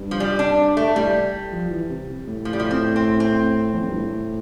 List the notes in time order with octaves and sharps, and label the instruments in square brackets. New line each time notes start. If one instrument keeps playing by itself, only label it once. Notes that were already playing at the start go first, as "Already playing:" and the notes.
Already playing: [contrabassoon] G2
[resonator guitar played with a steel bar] F3
G3
D4
A3
[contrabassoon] A2 [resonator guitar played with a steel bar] G3
[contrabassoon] F3
E3
C3
A2
[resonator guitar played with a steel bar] F3
G3
F3
C4
C4
C4
[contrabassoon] E2
F2
G2
A2